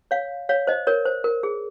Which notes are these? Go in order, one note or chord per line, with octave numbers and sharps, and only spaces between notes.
C#5 F5
C#5 F5
C5 D#5
A#4 C#5
C5
A#4
G#4